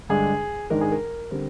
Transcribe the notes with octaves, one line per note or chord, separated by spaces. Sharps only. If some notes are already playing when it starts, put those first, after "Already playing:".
G2 D3 G#3 D4 G#4
G#2 D#3 G#3 D4 A#4
G#4
A#4
D3 G3 C4